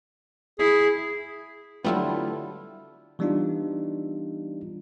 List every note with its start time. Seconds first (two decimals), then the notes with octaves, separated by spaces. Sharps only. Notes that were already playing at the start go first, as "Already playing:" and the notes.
0.59 E4 G#4
1.84 D3 F#3 G3 A3 B3 E4 F4 A4
3.19 E3 G3 B3 D4 D#4 F4